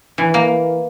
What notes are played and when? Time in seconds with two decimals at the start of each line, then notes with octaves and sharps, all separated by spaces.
0.18 E3
0.34 A#3